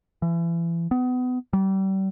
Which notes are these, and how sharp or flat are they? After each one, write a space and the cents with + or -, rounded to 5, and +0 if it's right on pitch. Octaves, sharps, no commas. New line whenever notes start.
E3 +35
B3 +30
G3 -35